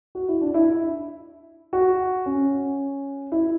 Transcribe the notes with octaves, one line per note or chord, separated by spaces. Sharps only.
F#4
E4
D4
E4
F#4
C#4
E4